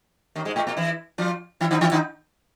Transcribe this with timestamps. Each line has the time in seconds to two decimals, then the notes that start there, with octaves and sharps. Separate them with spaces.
0.35 D#2 D#3
0.45 G#2 G#3
0.56 A2 A3
0.67 A#2 A#3
0.77 E3 E4
1.18 F3 F4
1.61 E3 E4
1.71 D#3 D#4
1.81 E3 E4
1.92 D#3 D#4